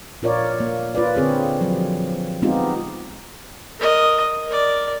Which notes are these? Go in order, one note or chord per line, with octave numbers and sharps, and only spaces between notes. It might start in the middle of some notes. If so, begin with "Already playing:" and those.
A#2 F4 A#4 C#5 D5
A#3
F4 B4 D5
D3 C4 G#4 C#5
F3 F#3 C4
G#3 B3 C4 D#4 F4 G4
A#4 D#5
A#4 D5